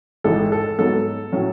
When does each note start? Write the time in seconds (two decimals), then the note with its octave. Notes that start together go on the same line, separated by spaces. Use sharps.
0.24 A1 G#2 E3 G#3 A4
0.52 A4
0.79 G#2 F#3 B3 A4
1.32 A2 F#3 C#4